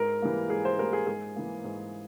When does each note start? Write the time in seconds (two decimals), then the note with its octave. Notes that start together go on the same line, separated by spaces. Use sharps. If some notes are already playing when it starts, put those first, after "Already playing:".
Already playing: G#2 A#4
0.22 E3 G3 A#3
0.50 G#2 G#4
0.65 C5
0.78 E3 G3 A#3 A#4
0.93 G#4
1.07 G#2 G#4
1.36 E3 A#3
1.64 G#2